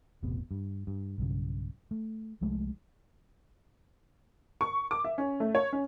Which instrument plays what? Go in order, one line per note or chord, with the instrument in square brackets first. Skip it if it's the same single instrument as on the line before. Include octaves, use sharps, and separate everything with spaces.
[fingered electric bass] E1 A1 C3 B3
G2
G2
B1 G2 C#3
A3
C2 F3 G#3 A3
[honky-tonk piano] C#6
D6
E5
C#4
A3
C#5
C#4